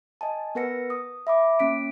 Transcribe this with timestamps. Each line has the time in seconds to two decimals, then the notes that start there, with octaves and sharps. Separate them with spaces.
0.21 D#5 G#5 A5
0.55 B3 A#4 B4 F#5 A#6 C#7
0.90 D#6
1.27 E5 B5 D6
1.59 A#3 C#4 B6 D7